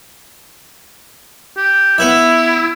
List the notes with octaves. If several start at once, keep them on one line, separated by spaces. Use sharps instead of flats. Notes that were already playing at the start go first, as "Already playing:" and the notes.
G4
B3 E4 B4 E5